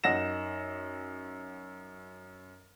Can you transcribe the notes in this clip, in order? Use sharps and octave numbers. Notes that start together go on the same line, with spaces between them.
F#2 D#4 F#5 A#6 E7